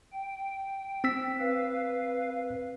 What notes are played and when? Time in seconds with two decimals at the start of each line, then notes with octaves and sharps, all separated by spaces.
0.12 G5
1.04 C4 E6 B6
1.39 B4 F5